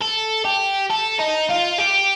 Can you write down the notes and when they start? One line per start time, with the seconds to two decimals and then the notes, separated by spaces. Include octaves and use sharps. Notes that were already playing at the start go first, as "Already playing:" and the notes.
0.01 A4
0.45 G4
0.90 A4
1.19 D#4
1.49 F4
1.78 G4